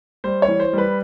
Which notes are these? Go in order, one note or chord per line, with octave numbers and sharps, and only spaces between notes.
G3 C5
C#5
E3
C5
G3 B4